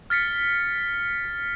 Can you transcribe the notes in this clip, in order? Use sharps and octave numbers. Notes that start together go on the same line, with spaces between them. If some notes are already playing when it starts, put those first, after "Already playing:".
F6 A6 B6 C#7